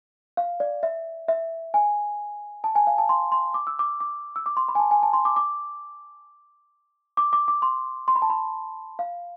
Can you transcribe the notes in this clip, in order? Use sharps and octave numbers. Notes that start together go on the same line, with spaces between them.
F5
D5
E5
E5
G#5
A5
G#5
F5
A5
C6
C6
D6
E6
D6
D6
E6
D6
C6
B5
G#5
A5
G#5
A5
C6
D6
D6
D6
D6
D6
C6
C6
B5
A5
B5
F5